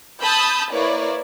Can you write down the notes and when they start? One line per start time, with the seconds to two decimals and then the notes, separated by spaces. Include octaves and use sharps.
0.21 A5 B5 D#6 E6 G6
0.71 A#3 E4 B4 C#5 D5